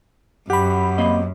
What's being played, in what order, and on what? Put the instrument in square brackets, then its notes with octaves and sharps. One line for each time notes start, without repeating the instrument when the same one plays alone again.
[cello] F#2 [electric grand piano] G4 [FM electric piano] F#5 B5
[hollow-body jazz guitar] A#3 C4 D#5